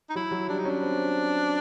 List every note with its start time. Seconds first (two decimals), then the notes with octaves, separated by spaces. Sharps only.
0.10 D#4
0.15 F#3 E4
0.31 F#3
0.48 G3 D4
0.58 D#4
0.65 C#4
0.69 D4
0.82 C4